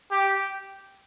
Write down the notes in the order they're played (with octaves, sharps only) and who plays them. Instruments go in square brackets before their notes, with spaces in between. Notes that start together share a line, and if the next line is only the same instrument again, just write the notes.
[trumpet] G4